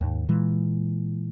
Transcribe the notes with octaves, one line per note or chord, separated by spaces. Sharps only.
D#2 G#2
A#2 E3 G#3